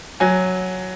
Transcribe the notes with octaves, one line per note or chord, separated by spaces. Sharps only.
F#3 G#5